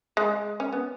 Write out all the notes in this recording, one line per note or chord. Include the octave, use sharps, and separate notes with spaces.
G#3
C#4
B3